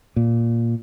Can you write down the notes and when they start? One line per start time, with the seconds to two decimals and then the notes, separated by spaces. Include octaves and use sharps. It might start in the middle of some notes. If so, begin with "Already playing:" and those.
0.16 A#2